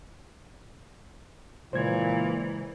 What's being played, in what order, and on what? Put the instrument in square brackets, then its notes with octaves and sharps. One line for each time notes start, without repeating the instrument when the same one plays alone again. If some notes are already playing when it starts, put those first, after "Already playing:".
[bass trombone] A#2 [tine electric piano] C#3 G#3 [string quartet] E3 [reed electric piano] C5 G#6